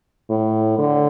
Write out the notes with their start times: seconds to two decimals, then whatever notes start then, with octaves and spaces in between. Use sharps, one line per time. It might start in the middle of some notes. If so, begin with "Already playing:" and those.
0.29 A2
0.79 D3